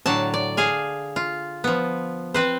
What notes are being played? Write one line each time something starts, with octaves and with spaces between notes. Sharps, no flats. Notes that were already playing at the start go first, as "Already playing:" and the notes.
A2 D3 F#3 D5 A5
D5
G#4 F5 G#5
F4
F3 B3
C4 B4 C5